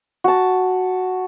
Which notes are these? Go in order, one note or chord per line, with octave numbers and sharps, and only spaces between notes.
F#4 A5